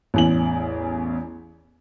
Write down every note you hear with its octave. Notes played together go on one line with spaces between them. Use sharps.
A1 E2 F#7